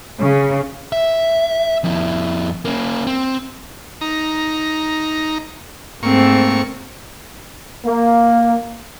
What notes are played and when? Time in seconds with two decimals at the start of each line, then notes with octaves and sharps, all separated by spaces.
0.20 C#3
0.93 E5
1.84 F2 E4
2.65 A#3 C#4
3.07 C4
4.01 D#4 A#5
6.03 G#2 A3 A#3 C4 C#6
7.85 A#3